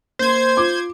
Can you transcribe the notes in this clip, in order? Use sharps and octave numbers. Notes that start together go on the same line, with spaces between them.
A#3 C5 G#6
F4 D6